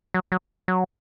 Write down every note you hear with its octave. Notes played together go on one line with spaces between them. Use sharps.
F#3
F#3
F#3